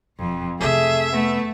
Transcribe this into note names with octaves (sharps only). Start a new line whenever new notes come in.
E1 F2
F2 C3 A3 G#4 E5
A3 B3